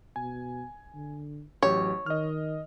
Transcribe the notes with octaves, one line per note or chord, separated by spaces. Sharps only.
B2 G#5
D3
A1 F#3 G4 C#5
D#3 D#5 F6